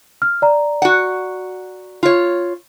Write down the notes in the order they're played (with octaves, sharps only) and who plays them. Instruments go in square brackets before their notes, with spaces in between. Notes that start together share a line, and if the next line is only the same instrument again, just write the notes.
[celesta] F6
D5 A#5
[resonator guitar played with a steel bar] F#4 F#5
F4 C#5